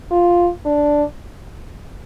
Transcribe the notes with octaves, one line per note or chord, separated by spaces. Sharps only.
F4
D4